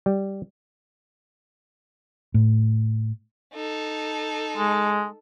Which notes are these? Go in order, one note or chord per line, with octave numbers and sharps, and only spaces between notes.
G3
A2
D#4 A4
G#3